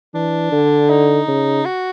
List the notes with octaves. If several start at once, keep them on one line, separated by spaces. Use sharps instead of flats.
E3 D4
D3
D#4
C#3
F#4